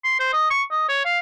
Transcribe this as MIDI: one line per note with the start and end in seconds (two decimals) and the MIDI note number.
0.04 0.17 84
0.20 0.32 72
0.33 0.50 75
0.50 0.63 85
0.71 0.85 75
0.89 1.04 73
1.05 1.19 77